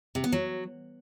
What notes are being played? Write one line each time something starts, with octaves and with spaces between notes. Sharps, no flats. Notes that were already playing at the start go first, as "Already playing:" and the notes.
C3
B3
F#3